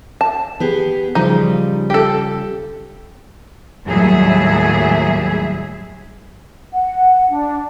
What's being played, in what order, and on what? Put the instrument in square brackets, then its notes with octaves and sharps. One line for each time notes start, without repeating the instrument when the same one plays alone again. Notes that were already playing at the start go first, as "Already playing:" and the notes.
[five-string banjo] A5
[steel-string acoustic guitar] B3 G4 G#4
[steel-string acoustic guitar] C#3 F3 G3 [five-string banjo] D#4
[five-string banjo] G4 A4
[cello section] D#2 A2 F#3 G3 G#4 E5
[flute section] F#5
D4